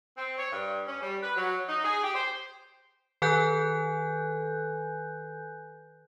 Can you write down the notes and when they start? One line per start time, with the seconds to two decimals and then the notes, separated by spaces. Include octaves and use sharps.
0.17 C4
0.37 C#5
0.51 G2
0.87 C#4
1.01 G3
1.22 B4
1.36 F#3
1.67 D#4
1.83 G#4
2.02 G4
2.14 C5
3.22 D#3 A4 B4 G#5 F#6 G6